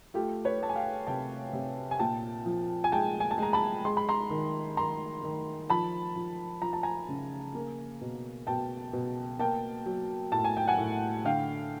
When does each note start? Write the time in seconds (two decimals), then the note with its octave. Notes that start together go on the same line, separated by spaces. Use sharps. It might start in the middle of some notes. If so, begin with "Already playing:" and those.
0.14 A3 F4 G4
0.45 B4 C#5
0.60 A3 A5
0.69 G#5
0.76 F5 G5
1.07 C3 G5 A5
1.53 C3
1.91 G#5
1.99 A#2 G5 A5
2.46 F3
2.84 G#5
2.92 G#3 G5 A5
3.20 G#5
3.31 A5
3.38 G#3 A#5
3.53 A5 B5
3.85 G#3 C6
3.97 B5
4.09 A#5 C6
4.30 D#3
4.77 D#3 A#5 C6
5.23 D#3
5.70 F3 A5 B5
6.16 F3
6.62 F3 A#5
6.73 A5
6.83 G#5 A#5
7.08 C#3
7.55 A#3
8.01 B2
8.47 B2 G5 A5
8.93 B2
9.39 A#3 G5 A5
9.86 F#3
10.32 A2 A5
10.44 G#5
10.57 G5
10.68 F#5 G#5
10.78 A2
11.25 D3 F5 G5